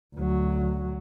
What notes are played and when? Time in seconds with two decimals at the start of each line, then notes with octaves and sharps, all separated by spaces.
0.16 D2 F#3